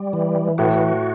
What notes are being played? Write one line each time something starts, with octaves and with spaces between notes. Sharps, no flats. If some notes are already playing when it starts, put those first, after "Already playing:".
Already playing: G3
E3
A2 F#4